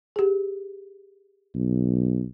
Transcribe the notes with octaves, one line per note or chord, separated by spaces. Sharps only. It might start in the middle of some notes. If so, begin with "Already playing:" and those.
G4 G#4
B1